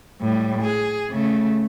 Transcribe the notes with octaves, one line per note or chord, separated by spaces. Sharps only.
A2 G3
G#4
C#3 A3